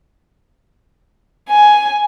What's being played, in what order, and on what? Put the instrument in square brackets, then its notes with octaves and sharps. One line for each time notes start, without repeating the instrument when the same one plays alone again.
[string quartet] G#5